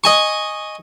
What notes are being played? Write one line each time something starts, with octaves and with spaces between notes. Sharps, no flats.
D#5 G#5 C#6